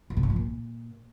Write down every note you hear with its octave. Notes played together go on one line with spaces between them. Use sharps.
G#2
C3
G#2
F3
A#2